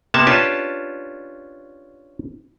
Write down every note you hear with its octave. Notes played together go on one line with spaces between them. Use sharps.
C3 A#3 B3 E5 A5
C#4 D4 F4 G4 B4 A5